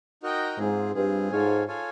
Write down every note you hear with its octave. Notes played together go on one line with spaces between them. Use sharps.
D#4 F#4 A#4 D#5 G5
G#2 C4 F4 G#4
G2 C4 F4 G#4
G#2 F4 A4 C#5 F5 G#5
F4 A4 C#5 F5 G#5